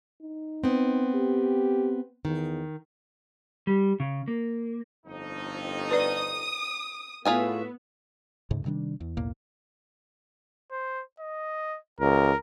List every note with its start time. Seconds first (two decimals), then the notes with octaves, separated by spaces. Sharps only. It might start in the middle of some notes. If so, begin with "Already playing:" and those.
0.22 D#4
0.64 B3 C4
1.14 G4
2.25 E2 D#3
3.67 G3
4.00 C#3
4.28 A#3
5.06 G1 F2 D#4
5.91 B4 D5 D#6
7.25 A2 B3 F4 F#4 G#4 E5 G#5
8.51 D2 G#2 C#3
8.65 C3 D#3 G3 D4
9.00 E2
9.17 B1 E2 A2 A#3
10.71 C5
11.20 D#5
12.00 C#2 A#4